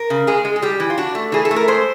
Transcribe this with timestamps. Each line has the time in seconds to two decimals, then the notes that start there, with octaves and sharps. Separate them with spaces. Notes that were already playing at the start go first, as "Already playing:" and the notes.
Already playing: A#4
0.10 C#3
0.27 G#3 G#4
0.45 G#3
0.56 G#4
0.62 G3 G4
0.80 E3
0.90 F4
0.98 D4 F#4
1.15 A3
1.32 E3 G#4
1.45 A4
1.51 A3
1.56 A#4
1.68 G#3 C5